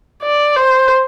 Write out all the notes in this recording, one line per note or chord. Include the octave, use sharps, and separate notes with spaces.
D5
C5